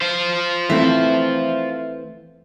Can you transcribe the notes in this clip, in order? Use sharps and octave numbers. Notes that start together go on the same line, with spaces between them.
F4 C5
E3 A3 C4 E5